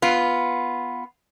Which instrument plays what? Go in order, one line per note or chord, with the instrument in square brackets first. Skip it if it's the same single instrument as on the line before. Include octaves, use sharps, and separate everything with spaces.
[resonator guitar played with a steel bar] B3 F4